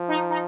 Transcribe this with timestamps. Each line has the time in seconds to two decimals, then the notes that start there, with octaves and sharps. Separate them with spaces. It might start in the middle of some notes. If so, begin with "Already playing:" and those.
Already playing: F3
0.08 D#4
0.30 D#4